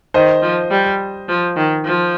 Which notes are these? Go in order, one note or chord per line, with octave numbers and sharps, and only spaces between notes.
D#3 C5 D#5
F3
G3
F3
D#3
F3